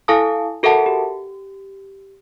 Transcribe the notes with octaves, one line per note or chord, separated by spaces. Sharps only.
E4 A4 F5 G#5 A5 D#6
F#4 A4 A#4 E5 F#5 A5
G4